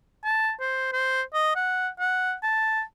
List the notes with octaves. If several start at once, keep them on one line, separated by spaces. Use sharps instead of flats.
A5
C5
C5
D#5
F#5
F#5
A5